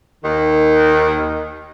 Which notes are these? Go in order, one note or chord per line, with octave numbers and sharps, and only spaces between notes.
D#2 D#3